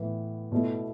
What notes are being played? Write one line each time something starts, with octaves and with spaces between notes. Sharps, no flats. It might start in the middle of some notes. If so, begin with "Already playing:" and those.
Already playing: A2 E3 B3
B2 A3 E4